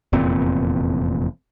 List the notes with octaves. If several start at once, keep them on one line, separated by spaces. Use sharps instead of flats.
F1 E2 A#2 C4